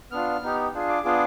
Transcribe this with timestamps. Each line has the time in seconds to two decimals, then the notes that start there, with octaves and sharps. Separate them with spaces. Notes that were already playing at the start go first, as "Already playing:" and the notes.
0.11 B3 D4 F4 F6
0.43 B3 D#4 G4
0.74 D4 F4 G#4
0.89 D6
1.05 B3 D4 F4 G#4 D6